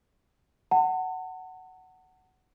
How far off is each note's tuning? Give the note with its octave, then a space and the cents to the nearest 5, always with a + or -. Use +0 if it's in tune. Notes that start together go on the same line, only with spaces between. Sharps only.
F#5 +10 A5 +45